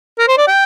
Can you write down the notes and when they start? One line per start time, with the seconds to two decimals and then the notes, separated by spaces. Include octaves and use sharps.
0.19 A#4
0.28 C5
0.37 D5
0.48 G5